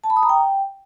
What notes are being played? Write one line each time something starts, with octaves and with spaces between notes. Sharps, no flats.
A5
B5
D#6
A#5
G5